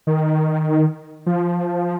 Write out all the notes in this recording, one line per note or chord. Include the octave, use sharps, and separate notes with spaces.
D#3
F3